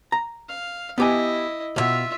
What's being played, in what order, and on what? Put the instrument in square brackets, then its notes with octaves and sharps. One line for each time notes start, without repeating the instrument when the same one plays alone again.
[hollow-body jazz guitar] A#5
[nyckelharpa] F5
[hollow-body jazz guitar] B3 G4 G#5 [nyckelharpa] E4 D#5
[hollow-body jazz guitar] C#2 B2 [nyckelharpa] F4 E5